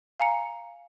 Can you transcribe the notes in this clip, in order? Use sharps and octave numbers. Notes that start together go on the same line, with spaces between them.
F5 G#5 A#5 C#7